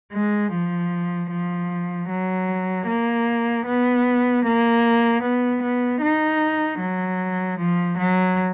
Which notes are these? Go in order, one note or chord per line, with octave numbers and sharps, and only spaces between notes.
G#3
F3
F3
F#3
A#3
B3
A#3
B3
B3
D#4
F#3
F3
F#3